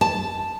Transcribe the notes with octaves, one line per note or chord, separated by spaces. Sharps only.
A5